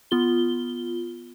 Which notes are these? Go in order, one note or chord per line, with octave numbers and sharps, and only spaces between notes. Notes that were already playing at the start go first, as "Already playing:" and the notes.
B3 F4 G7